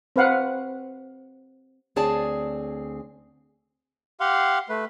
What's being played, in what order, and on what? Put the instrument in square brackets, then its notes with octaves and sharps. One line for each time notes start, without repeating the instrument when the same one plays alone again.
[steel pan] C4 B4 F5 F#5
[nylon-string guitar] D2 C4 G#4 C#5 D5 A5
[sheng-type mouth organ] G4 F5 F#5 C6
A3 B4